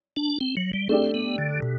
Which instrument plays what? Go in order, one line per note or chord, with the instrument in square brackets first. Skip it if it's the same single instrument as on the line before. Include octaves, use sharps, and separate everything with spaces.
[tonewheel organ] D4
C4
F#3
G3
[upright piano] A3 D4 G4 [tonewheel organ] C4
[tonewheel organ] B3
D3
B2